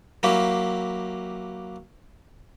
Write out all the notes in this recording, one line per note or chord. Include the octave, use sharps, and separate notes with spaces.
F#3 A#3 E4 G4